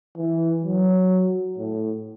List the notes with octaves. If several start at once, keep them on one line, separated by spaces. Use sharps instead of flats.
E3
F#3
A2